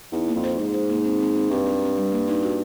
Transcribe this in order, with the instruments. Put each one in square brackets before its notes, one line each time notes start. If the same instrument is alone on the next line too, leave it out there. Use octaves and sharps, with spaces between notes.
[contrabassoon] E2 [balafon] D#4
[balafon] A#3
[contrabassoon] F2
[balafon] C5
[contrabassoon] G#2 [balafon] G#4
[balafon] C5
A#3
C4
C4
C4
[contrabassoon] G2 [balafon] C4
[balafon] C4
C4
G3
A#3
D#4
F#4